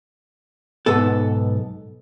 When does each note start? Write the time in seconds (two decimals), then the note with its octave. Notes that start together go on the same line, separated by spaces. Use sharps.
0.86 B1 G#2 B3 A4